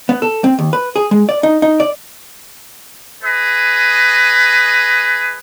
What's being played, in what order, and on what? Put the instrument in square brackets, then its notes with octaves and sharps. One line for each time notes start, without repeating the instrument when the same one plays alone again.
[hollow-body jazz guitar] B3
A4
C4
D#2
B4
G#4
G#3
D5
D#4
D#4
D5
[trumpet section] G#4 B4 D#5